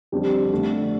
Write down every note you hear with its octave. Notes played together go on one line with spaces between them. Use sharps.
F2 D3 G3 D4 G4
F2 D3 A3